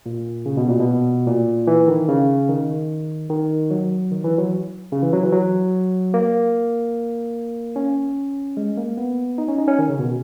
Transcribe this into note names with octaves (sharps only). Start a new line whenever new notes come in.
A#2
C#3
B2
A#2
B2
A#2
E3
D#3
C#3
D#3
D#3
F#3
D#3
E3
F#3
C#3
E3
F#3
E3
F#3
A#3
C#4
G#3
A#3
B3
D#4
C#4
D#4
C#4
D#3
C#3
B2